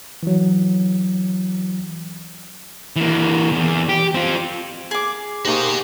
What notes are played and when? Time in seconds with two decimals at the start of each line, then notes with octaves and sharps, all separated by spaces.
0.23 E3 F#3
2.96 E3 A#3
3.52 E2
3.89 G4
4.14 C4 F4
4.91 G#4 D6
5.45 A#3 D#4 F#4 G4 C5 D#5 G#5 C#6